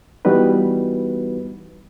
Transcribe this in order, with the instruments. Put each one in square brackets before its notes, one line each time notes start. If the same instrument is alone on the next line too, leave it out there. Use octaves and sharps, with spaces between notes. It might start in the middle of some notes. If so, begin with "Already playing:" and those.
[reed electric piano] E3 G3 B3 D#4 F#4 B4